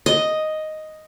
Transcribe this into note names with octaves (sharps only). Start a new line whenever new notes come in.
D#5